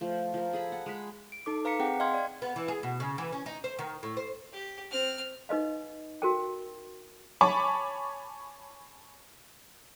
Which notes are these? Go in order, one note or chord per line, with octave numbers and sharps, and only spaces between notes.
F3 A3
F3 A#4
G#4 A4 B5
F#5
G#3 B5
D7
D#4 A4 D6
B4 F5 A#5 D6 B6 C#7
C4 G#4 F#5 G5
D#5 F5 G5 C6 F6 G#6
D5 G#6
B3
E3
G#4
B2
C#3
E3
C#4
D#4
C5
D#3
A2
C5
G4
C4 F6
D#4 B4 D#5 F5
F#4 A#4 G5
C#5 G#5 A5 B5 C#6 D6